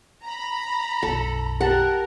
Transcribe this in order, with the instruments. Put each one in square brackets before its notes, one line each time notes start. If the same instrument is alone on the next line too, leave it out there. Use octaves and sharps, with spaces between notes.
[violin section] A#5 B5
[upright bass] B1 F#2 [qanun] A4
[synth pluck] G4 A5 [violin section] A#4 [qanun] F#5